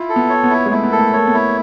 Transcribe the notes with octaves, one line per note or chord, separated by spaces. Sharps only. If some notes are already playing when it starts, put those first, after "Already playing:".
Already playing: E4 F4
A4
B3
C#5
B3
E4
G#3
A3 E4
B3
A#3 A4
A3
A#3 C#5
B3
E4